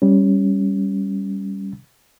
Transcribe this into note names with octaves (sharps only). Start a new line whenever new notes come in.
G3 C#4